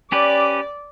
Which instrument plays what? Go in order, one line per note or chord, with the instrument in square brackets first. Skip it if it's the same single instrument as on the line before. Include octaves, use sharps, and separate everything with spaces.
[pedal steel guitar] C#4 G4 B4 [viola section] D5